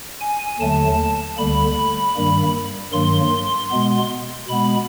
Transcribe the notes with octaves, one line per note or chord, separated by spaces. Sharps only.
G#5
D#2 D3 F#3 A3 A5
D2 D3 G3 A#3 B5
G2 D#3 G3 A#3
G2 D#3 F#3 A#3 C6
B2 G#3 B3
B2 G#3 B3 B5